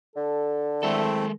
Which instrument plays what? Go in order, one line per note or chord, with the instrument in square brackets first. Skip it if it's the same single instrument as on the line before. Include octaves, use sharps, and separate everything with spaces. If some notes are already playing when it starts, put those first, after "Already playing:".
[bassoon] D3 [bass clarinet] A4
[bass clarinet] D#3 [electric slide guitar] G#3 A4 [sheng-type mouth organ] A3 C4 E4